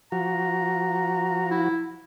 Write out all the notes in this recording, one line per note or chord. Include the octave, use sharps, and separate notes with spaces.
F3 F#4 A#5
E4